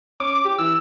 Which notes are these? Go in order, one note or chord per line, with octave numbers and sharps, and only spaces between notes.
C#4 D6
G4
E3 E6